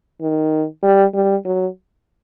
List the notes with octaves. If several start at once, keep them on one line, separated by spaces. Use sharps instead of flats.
D#3
G3
G3
F#3